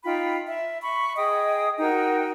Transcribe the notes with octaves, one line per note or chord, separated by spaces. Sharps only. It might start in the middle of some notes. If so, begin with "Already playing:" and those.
D#4 F4 G5 B5
E5
B5 C#6
G#4 D#5 G5 D#6
D#4 F#4 A#4 G5